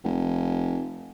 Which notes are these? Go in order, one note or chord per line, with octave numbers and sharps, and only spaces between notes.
F1